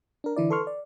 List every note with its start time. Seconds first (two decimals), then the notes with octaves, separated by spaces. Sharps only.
0.24 D4 A#4
0.36 D3 E3 E4 D5
0.50 A4 B4 C6 C#6 F6
0.67 D5